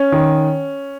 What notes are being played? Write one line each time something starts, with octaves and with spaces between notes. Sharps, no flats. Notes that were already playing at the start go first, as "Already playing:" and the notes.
Already playing: C#4
D#3